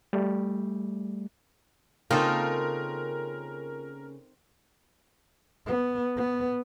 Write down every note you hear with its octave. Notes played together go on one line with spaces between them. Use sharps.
G3 A3
C#3 A#3 C4 D#4 F4 A4 A#4
B3
B3